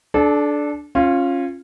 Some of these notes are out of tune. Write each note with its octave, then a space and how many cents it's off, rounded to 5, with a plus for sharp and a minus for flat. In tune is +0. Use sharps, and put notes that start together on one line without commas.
D4 +0 A4 -35
C#4 -20 F4 +0